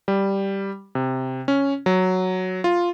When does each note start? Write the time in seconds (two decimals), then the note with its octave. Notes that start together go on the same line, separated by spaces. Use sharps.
0.08 G3
0.95 C3
1.48 C#4
1.86 F#3
2.64 F4